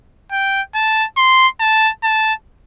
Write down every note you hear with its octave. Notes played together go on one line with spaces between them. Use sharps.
G5
A5
C6
A5
A5